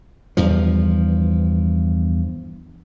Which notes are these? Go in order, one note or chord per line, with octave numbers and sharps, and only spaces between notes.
E2 G2 F3